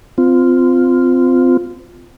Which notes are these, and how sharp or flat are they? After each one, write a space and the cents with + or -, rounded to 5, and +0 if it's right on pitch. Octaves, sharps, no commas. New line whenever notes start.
C4 -20 F4 +0